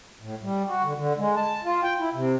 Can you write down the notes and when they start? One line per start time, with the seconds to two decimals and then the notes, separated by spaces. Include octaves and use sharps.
0.22 A2
0.43 G3
0.68 F#4
0.83 D3
0.96 D3
1.18 G#3
1.36 A5
1.64 F4
1.83 G5
2.00 E4
2.15 C3